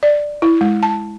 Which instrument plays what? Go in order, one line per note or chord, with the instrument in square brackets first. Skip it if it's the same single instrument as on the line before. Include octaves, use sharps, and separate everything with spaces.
[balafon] D5
E4
G#3
A5